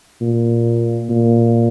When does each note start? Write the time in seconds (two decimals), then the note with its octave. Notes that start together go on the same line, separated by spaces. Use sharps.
0.21 A#2
1.09 A#2